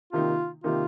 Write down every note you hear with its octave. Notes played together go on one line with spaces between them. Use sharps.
C3 D#3 A#3 D#4 F4
C3 D#3 A#3 D#4 F4